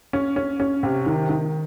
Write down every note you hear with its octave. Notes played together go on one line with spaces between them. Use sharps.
C#4
C#4
C#4
C3
D#3
D#3